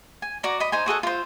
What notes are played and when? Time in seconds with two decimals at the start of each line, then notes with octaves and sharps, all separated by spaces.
0.22 G#5
0.43 F#4 D5 A#5
0.60 D#5 B5
0.72 D#4 C5 G#5
0.86 F#4 G#4 A4 F#5
1.03 F4 C5